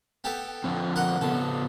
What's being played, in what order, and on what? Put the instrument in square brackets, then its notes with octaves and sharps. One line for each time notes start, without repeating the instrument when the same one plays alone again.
[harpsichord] B3 G4 A4
[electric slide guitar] D3 F3 C4
[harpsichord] A#4 D#5 F#5
[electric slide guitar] C#3 B3 [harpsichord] A4